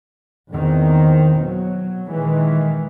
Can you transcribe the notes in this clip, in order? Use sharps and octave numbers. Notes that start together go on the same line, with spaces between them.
E2 D#3 A#3 C4
B2 F#3
A#2 D#3 E3 G#3